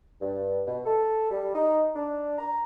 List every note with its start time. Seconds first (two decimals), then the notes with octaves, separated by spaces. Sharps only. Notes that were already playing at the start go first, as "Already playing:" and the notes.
0.21 G2
0.66 B2
0.86 A4
1.31 G3
1.54 D#4
1.95 D4
2.38 A#5